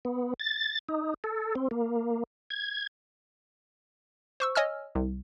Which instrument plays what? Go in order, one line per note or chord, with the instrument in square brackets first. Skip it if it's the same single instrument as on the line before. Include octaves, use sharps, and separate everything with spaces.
[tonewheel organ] B3
A6
D#4
A4
C4
A#3
G#6
[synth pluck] C5 C#6 E6
C#5 D#5 G#5 E6 F6
C2